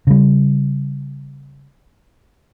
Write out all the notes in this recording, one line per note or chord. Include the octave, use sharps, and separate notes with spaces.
C#3 G3